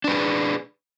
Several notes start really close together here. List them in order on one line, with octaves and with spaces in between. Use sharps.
D4 B4 G4 G#4